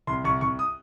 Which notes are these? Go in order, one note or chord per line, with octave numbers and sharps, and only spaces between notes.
C2 C6
C2 C#6
C2 C#6
D#6